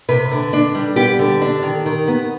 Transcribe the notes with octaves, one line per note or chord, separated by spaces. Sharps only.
C3 B4
D3
D4
G3
B3 G4
D3
D4
D#3
D#3
B3